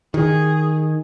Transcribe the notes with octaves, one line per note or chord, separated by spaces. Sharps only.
D#3 G#4